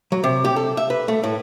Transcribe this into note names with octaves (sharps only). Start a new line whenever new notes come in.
F#3
C3
G4
A4
E5
B4
A3
A2